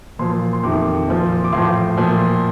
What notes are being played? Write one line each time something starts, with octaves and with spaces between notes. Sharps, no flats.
A#2 F3 C6
C6
F2 C3 D#3 D6
A#2 F3
D6
A2 C6
F3
A#2 F3